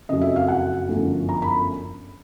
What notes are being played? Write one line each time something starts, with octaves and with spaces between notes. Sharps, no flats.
F#1 F2 C#3 F#3 D#5
E5
F5
F#5
G1 F#2 D3 F3 A3
A#5
B5